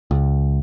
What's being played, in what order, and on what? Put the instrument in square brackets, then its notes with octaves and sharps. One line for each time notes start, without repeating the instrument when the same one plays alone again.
[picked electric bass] C#2